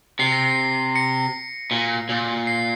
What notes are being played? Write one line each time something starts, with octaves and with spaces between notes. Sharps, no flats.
C3 C7
A#6
C7
A#6 C#7
A#2
A#2
C7